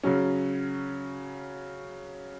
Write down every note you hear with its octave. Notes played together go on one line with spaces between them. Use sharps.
C#3 F#3 C#4